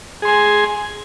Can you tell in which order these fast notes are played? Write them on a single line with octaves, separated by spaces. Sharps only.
G#4 C6 G#5